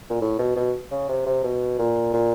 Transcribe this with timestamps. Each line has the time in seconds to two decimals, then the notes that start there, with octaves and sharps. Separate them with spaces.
0.10 A#2
0.21 A2
0.38 B2
0.56 B2
0.91 C#3
1.09 C3
1.26 C3
1.43 B2
1.78 A#2
2.14 A#2